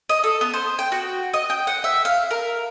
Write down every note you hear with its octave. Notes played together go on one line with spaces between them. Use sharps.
D#5
A4
B3
C5
G5
F#4
D#5
G5
F#5
E5
F5
A#4